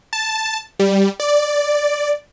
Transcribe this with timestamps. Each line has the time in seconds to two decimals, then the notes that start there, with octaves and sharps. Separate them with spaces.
0.13 A5
0.79 G3
1.20 D5